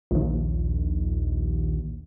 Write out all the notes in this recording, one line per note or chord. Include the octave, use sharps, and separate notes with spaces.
A#1 D#2